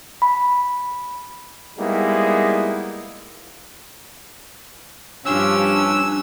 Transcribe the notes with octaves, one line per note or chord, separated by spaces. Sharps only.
B5
G3 G#3 A#3 B3 D#4 E4
G2 F3 C#4 D4 G4 E6